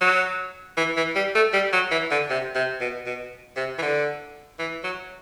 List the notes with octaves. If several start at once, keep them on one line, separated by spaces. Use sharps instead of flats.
F#3
E3
E3
G3
A3
G3
F#3
E3
D3
C3
C3
B2
B2
C3
E3
D3
E3
F#3